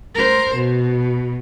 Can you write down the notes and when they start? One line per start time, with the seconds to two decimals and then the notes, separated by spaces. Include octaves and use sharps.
0.15 A#4 C5
0.56 B2